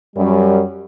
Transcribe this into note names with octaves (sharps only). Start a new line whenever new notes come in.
F#2 G3